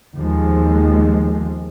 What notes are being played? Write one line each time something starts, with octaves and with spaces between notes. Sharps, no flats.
D#2 F3 G#3